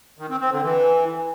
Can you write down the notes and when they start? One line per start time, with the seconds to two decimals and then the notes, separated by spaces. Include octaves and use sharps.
0.18 D#3
0.29 C4
0.40 C4
0.51 D3
0.62 E3